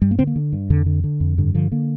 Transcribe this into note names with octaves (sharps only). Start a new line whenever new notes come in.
G2 G3
A#3
D3 C4
A#3
D3
G2
F2 D3
D3
D3
F2
G2 D3
D3 F3
D3 A#3